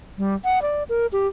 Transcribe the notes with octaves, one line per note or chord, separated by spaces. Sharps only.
G3
F#5
D5
A#4
G4